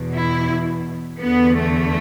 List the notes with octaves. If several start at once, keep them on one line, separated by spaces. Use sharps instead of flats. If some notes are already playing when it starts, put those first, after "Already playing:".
Already playing: E2 B2
E4
E2 D3 B3
A3